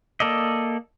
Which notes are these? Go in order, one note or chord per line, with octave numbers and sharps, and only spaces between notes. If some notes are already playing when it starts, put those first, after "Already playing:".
A#3 A4 D5 D#5